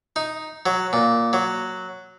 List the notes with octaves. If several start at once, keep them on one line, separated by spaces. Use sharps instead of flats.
D#4
F#3
A#2
F#3